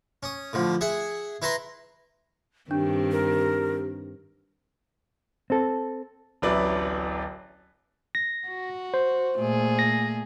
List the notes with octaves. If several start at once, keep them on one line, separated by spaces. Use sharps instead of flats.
C#4 D#6
A2 D3 F3
G#4 E5 F#5
E4 B4 E5 A#5 C6
G2 D#3 C4 D4 G4
A#4
C4 A4
D1 A1 F#3 E4 B4 D5
A#6
F#4
C5
A#2 A3 G#4
A#6